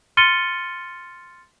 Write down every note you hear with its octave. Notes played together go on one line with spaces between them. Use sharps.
C6 F6 A6 C#7 D#7 G7